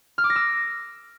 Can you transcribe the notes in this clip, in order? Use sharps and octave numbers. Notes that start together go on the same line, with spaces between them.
F6
D6
A#6
E6